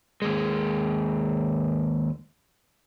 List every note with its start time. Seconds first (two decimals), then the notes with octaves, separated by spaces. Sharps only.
0.22 D#2 G#3